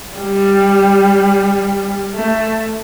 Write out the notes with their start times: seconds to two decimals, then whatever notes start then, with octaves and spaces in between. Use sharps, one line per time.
0.17 G3
2.14 A3